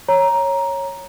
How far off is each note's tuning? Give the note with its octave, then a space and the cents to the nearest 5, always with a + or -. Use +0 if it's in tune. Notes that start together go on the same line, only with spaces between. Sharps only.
C#5 -10 A#5 +10